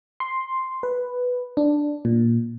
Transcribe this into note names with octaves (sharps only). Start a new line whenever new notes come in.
C6
B4
D4
A#2